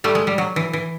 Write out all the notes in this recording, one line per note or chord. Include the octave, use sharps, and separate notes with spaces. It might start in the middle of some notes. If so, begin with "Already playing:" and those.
G3 A3
G#3
G3
F#3
E3
E3